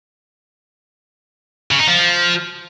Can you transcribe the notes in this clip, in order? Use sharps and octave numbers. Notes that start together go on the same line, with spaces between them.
C#3
D#4
F3